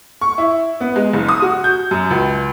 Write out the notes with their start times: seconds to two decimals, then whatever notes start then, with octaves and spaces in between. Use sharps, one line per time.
0.21 C#6
0.38 E4
0.80 B3
0.96 G#3
1.13 F#1
1.28 D#6
1.42 F#4
1.64 G6
1.91 F#2
2.10 C#2